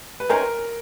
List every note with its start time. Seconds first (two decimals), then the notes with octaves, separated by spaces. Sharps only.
0.20 B4
0.29 C3 D#3 G#3 C#4 A#4